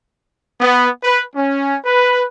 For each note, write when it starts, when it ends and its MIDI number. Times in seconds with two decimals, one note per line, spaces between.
0.61 0.88 59
1.03 1.23 71
1.36 1.76 61
1.85 2.25 71